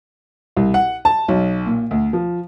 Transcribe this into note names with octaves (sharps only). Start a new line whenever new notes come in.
C2
F#5
A5
B1
A#2
D2
F3